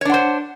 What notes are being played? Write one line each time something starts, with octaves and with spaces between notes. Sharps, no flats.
D4 C5 C#5 F#5